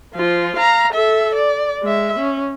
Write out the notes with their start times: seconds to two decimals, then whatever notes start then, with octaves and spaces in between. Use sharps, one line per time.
0.15 F3 F4
0.56 F5 A#5
0.93 A4 E5
1.35 D5
1.83 G#3 E5
2.19 C#4